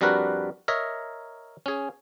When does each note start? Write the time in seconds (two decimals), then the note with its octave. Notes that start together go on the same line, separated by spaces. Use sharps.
0.01 F2 G3 D4 F#4 A#4 B4
0.68 A#4 C#5 D#5 E5 A#5
1.66 C#4 G#4